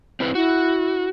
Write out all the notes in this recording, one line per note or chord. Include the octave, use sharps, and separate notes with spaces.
C4 E4 B4
E4 F#4